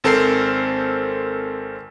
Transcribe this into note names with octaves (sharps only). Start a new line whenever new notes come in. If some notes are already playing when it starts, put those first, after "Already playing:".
G#1 C4 A4 A#4 C5 C7